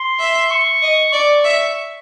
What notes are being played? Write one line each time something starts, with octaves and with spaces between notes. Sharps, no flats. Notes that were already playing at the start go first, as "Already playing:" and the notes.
Already playing: C6
E5
C#6
D#5
D5 C#6
E5